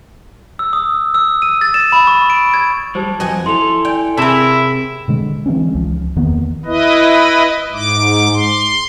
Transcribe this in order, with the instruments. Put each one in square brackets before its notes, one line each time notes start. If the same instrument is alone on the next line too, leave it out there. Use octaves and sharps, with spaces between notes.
[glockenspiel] E6
D#6
E6
D#7
A6
E7
B5
C#6
D7
G#6
[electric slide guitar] F#3 G3 [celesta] C5 A5
[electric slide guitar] F2 F#3 [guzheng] D#5 F#5 G#5
[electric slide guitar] E4 A4 [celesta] C6 F7
[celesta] D5 G#5 [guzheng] G5
[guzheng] C3 C4 [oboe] E4 [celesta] G#4 E7 [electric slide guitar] A#4 A5
[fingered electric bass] B2 D3 G#3
E3 G#3 C4 C#4
C#2 F3
E2 D#3 A#3 B3
[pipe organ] E4 B4 D#5
G#2 D6
C6